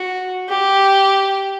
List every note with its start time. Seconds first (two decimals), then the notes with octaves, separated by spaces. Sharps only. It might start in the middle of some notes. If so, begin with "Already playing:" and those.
Already playing: F#4
0.49 G4